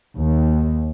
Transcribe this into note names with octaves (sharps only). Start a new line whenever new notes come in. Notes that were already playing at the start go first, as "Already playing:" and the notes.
D#2